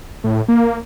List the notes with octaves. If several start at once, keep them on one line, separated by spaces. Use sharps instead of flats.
A2
A#3